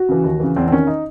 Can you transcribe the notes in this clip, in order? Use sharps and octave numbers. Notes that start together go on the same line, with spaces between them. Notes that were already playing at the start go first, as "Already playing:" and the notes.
Already playing: F#4
C#3 E3
D#2
C#3 E3
E2 C4
C4
D#3 C#4
D#4